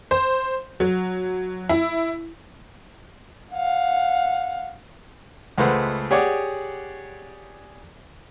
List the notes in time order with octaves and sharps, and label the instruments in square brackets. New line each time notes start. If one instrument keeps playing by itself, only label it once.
[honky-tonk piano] C5
F#3
E4
[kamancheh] F5 F#5
[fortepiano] C#2 G#3 A3 B4 C5 F#5
G4 G#4 C#5 D5 F#5 D6